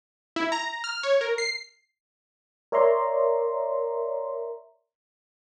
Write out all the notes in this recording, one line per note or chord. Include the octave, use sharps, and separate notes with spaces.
E4
A#5
F6
C#5
A#4
C7
A#4 C#5 D5 E5 A#5 C6